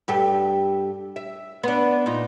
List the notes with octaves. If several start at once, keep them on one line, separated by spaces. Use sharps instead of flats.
G2 G4 A4
E5
B3 D4
A#2 D#4